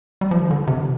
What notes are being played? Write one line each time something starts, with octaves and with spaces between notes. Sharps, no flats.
G3
F3
D#3
D3
C3
D#3